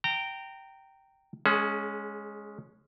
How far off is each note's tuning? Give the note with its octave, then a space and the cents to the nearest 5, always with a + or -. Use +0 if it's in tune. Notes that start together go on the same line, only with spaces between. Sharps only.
G5 -10 A#5 -20
G#3 +0 C#4 +0 G#4 +40